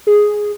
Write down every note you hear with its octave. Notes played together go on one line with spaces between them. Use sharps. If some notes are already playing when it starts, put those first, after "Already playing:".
G#4